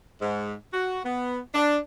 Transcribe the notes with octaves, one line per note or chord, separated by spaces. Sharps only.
G#2
F#4
B3
D4